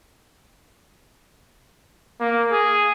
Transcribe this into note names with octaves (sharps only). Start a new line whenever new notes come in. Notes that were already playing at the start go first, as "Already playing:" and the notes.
A#3
G#4